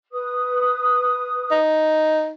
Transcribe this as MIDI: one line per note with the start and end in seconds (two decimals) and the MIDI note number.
0.12 1.58 71
0.12 1.58 87
1.52 2.30 63